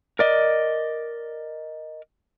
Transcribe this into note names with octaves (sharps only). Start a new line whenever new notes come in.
A#4 D5 D#5